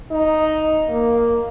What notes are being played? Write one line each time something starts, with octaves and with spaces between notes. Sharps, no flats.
D#4
A#3